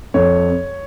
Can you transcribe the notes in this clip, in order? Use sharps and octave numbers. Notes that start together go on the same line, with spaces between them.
F2 C#5